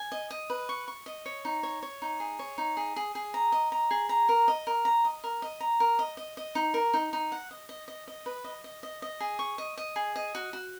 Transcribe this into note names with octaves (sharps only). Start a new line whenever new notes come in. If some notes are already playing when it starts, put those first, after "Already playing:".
Already playing: G#5
D#5
D#5
B4
C#6
C#6
D#5
C#5
D#4
C#5
C#5
D#4
G#4
C#5
D#4
G#4
G#4
G#4
A#5
D#5
A#5
G#4
A#5
A#4
D#5
A#4
A#5
D#5
A#4
D#5
A#5
A#4
D#5
D#5
D#5
D#4
A#4
D#4
D#4
F#5
D#5
D#5
D#5
D#5
B4
D#5
D#5
D#5
D#5
G#4
C#6
D#5
D#5
G#4
D#5
F#4
F#4